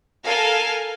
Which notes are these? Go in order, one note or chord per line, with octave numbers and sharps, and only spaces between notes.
A4 A#4 F5 G#5